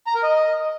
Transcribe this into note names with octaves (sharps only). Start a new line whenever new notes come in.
A#5
A#4
D#5